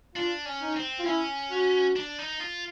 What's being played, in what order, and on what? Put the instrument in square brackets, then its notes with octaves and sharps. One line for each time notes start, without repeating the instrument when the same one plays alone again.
[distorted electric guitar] D4 [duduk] F4
[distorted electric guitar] C#4
[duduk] D#4
[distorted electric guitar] C4
[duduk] F4
[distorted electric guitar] C#4 [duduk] E4
[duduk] F#4
[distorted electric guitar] D4
D#4
F4